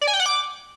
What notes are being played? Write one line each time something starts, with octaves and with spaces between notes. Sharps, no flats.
D5
G#5
G5
F#5
D6